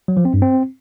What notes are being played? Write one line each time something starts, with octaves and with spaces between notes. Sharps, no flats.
F#3
F3
C4
G2
C4